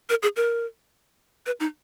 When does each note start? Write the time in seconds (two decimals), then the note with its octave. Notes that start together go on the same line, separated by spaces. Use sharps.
0.10 A#4
0.23 G#4
0.36 A#4
1.46 B4
1.60 D#4